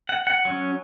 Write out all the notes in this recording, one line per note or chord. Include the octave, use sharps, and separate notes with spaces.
F#5
F#5
F#3 C#4